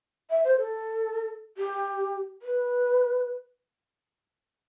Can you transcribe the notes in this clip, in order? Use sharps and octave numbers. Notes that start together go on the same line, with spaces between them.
E5
C5
A4
G4
B4